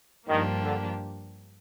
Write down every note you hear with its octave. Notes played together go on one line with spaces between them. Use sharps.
G2 D#3 F3 A#3 D4 G4
D3